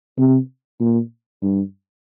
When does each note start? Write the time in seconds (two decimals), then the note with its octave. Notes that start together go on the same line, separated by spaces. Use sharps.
0.18 C3
0.80 A#2
1.42 G2